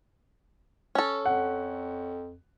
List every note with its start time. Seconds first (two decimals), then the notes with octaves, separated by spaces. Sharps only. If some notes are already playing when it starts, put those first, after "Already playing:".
0.95 C#4 A4
1.25 F2 F#5